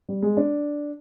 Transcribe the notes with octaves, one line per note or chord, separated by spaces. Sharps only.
G3
G#3
D4